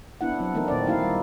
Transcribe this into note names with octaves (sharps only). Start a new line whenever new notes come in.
B3 D4 E4 F#5
F#3 C4
E3 A3 B3 D#4 A#4
A#2 D#3 C4 D5
A#3 D#4 E4 F#4 F5
G3